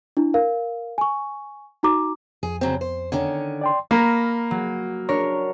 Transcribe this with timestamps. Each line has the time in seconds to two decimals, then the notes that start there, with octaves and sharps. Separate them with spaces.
0.17 D4 E4
0.34 A#4 F5
0.98 G#5 C#6
1.83 D#4 F#4 A#5 D6
2.43 F2 G#4
2.61 C#3 F#3 C4
2.81 C5
3.12 D3 D#3 C#4
3.61 D5 G5 C6
3.91 A#3 A#5 B5 F6
4.51 F#3
5.09 D4 A#4 C#5